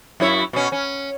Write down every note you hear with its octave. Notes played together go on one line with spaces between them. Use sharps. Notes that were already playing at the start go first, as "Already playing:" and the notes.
F#2 E4 C#5
B2 C#4
C#4